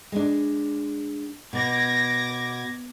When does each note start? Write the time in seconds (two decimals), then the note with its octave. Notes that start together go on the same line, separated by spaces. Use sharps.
0.12 G#3 D4
1.53 B2 D6 G#6 A#6